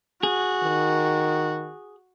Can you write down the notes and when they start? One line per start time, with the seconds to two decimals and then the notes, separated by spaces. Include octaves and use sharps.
0.23 F#4 G#4
0.63 D#3